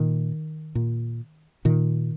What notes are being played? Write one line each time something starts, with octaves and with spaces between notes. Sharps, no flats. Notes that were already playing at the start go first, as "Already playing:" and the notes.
Already playing: A#2 D#3
A#2
A#2 D#3